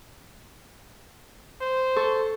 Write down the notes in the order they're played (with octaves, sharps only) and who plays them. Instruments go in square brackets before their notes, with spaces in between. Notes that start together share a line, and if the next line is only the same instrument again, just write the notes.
[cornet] C5
[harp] A4 C#6